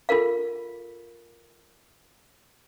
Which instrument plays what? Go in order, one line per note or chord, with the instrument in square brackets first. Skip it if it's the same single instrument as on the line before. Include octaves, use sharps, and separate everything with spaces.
[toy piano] F4 A4 A#4 F5